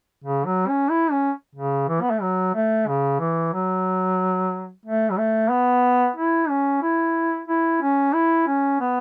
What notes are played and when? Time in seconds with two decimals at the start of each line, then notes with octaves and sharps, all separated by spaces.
0.24 C#3
0.45 F#3
0.68 C#4
0.90 E4
1.11 C#4
1.55 C#3
1.88 E3
2.01 B3
2.11 A3
2.22 F#3
2.55 A3
2.88 C#3
3.20 E3
3.54 F#3
4.85 A3
5.11 F#3
5.18 A3
5.50 B3
6.16 E4
6.49 C#4
6.82 E4
7.48 E4
7.82 C#4
8.14 E4
8.47 C#4
8.80 B3